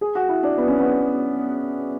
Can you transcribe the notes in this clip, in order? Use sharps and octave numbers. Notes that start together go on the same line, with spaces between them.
G#4
F#4
E4
D4
B3
C#4
B3